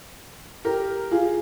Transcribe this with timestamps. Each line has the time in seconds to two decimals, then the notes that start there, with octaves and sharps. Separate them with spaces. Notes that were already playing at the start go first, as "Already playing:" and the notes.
0.65 G4 A#4
1.11 F4 G#4